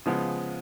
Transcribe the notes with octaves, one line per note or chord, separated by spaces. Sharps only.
C#3 F3 G#3 B3